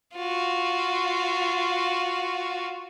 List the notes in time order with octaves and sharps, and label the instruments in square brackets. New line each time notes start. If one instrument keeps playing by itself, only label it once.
[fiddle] F4 F#4